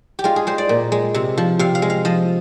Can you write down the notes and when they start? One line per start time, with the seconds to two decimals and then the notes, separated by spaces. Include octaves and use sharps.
0.19 G4
0.24 G#3 F4
0.36 G#4
0.47 G#3 C5
0.58 D5
0.69 A#2
0.92 G#3
1.14 C3
1.38 F3
1.59 C3 F5
1.75 F5
1.82 G#3
1.90 F5
2.05 F3 D#5